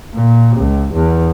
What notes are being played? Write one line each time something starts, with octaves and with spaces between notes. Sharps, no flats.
A#2
C#2
E2